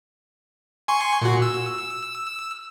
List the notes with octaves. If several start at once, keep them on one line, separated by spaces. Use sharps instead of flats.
G#5 C6 C#6
A#2 F#4
E6